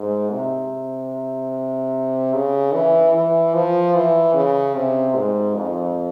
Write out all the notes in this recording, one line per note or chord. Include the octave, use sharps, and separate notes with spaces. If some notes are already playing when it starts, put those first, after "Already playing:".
Already playing: G#2
C3
C#3
E3
E3
F3
E3
C#3
C3
G#2
F2